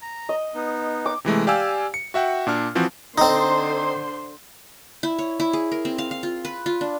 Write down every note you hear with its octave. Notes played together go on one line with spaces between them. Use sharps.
A#5
D#5
B3 D#4
D6
C3 E3 G#3 A3
G4 D5 F5 G5 G#5 E6
C#7
F#4 E5 F#5 G5
A#2 D4 F6
E3 F3 C4 F#4
D3 C4 D#4 C5 C6
E4
C#5
E4
G#4
A#4
C4
F5
F5
F4
B4
F4
D4